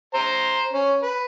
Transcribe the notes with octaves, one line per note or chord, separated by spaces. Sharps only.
C5 A#5
C#4
B4